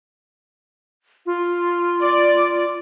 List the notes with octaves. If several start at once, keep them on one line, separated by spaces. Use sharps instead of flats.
F4
D5